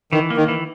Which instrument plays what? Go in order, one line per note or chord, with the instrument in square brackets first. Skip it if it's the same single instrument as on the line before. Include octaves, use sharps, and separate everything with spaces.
[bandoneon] D#3 [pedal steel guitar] E3
[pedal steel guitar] A#3
[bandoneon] D#3
[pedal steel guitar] E3